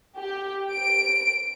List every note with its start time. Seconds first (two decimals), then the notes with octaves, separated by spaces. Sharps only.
0.18 G4
0.73 D7